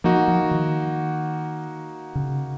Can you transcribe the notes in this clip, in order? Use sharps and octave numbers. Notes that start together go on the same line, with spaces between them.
F3 A#3 D#4 F#4
F3
D#3
C#3